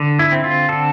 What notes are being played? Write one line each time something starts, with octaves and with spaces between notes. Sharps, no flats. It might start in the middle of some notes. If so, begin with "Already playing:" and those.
Already playing: D3
E4
C4
F4
D3 A4